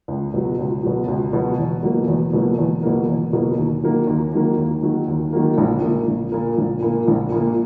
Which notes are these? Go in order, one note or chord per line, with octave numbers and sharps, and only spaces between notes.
C#2
B2 F#3
C#2
B2 F#3
C#2
B2 F#3
E2
B2 F#3 A#3
E2
B2 F#3 A#3
E2
B2 F#3 A#3
E2
B2 F#3 A#3
D#2
D#3 F#3 A#3
D#2
D#3 F#3 A#3
D#2
D#3 F#3 A#3
D#2
D#3 F#3 A#3
A#1
A#2 A#3
A#1
A#2 A#3
A#1
A#2 A#3
A#1
A#2 A#3